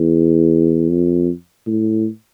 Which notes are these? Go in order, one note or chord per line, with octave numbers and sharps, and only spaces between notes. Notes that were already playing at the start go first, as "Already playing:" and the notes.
Already playing: E2
F2
A2